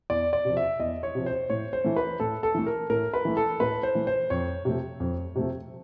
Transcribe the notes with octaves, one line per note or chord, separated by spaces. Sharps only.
E2 D5
D5
C3 F3
E5
E2 D#5
C#5
C3 F3
C5
A2 C#5
C5
E3 A3
B4
A2 A4
A4
E3 A3
A#4
A2 A#4
B4
E3 A3
A4
A2 B4
C5
E3 A3
C5
F2 C#5
C3 F3 A3
F2
C3 F3 A3